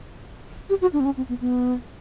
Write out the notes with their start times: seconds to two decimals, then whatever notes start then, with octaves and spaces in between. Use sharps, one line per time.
0.70 G4
0.81 F#4
0.93 D4
1.00 C4
1.05 C#4
1.17 C4
1.29 B3
1.41 B3